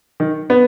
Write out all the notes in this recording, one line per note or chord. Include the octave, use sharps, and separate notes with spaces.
D#3
B3